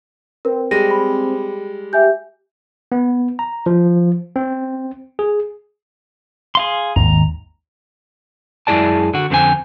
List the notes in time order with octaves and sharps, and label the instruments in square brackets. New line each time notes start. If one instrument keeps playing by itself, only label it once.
[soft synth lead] C4 [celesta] A#4 B4
[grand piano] G3 G#3 D#7 [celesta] A#6
[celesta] B5
[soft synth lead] G4 [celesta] E5 G#5 G6
[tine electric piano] B3
A#5
F3
C4
G#4
[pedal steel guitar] G#4 F5 C6
[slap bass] G#1 D#2 [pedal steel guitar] A#5
[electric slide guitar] F#2 G#3 E4 G#4 D5 A5
D3 F#4
F2 D3 C4 E4 G#5